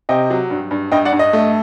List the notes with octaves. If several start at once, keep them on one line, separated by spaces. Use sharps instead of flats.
C3 D#5 G5
F#3
G2
G2
G2 D#5 G5
D5 F#5
G2
D#5
A3